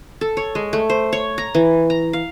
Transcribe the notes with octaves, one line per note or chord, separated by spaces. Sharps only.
A4
C#5
G#3
A3
C5
C#5
A#5
E3
A#5
F5